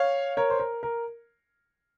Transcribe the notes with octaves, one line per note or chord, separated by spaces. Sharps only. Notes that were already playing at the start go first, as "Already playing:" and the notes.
Already playing: C#5 F5
A#4 C#5
C5
A#4
A#4